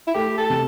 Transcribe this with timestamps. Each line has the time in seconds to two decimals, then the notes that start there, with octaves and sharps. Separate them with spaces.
0.07 E4
0.14 A3 G4
0.38 A4
0.50 C3